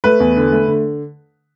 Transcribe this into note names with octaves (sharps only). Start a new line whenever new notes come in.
A3 B4
E2
D3
A3
D3